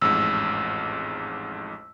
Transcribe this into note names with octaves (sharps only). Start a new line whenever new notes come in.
A1 F2 G#2 E6